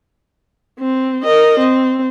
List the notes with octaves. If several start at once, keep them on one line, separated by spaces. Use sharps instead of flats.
C4
A#4 D#5
C4